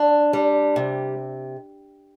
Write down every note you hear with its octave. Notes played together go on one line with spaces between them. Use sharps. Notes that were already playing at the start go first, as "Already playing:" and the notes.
Already playing: D4
G3
C3